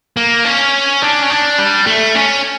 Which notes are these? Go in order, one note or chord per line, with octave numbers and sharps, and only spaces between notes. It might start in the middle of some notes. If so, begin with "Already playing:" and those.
A#3
C#4
D4
C#4
D4
G3
A3
C#4